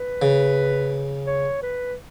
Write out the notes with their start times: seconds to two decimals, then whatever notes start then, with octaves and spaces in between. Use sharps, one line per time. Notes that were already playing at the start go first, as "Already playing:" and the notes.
Already playing: B4
0.22 C#3
1.27 C#5
1.63 B4